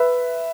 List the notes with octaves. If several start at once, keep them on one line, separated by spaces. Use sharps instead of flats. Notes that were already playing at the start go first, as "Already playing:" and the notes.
Already playing: B4 E5